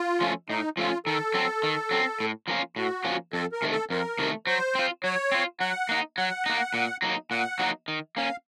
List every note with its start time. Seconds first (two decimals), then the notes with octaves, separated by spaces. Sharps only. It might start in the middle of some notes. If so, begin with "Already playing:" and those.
Already playing: F4
0.21 F3 A3 C#4
0.49 A2 D#4
0.77 F3 A3 C#4 F4
1.06 D#3 A4
1.34 F#3 C4
1.63 D#3
1.91 F#3 C4
2.20 A2
2.48 F3 A#3 C#4 F4
2.76 A2 F#4
3.05 F3 A#3 C#4 F4
3.33 F2 A4
3.52 A#4
3.62 C3 D#3 A3
3.72 A4
3.90 F2 A#4
4.19 C3 D#3 A3
4.47 F#3 C5
4.75 C4 F4
5.04 F#3 C#5
5.32 C4 F4
5.60 F#3 F#5
5.89 A#3 D#4
6.17 F#3 F#5
6.46 A#3 D#4
6.74 A#2
7.02 F#3 A#3 D#4
7.31 A#2 F#5
7.59 F#3 A#3 D#4
7.88 D#3
8.17 A#3 C#4 F5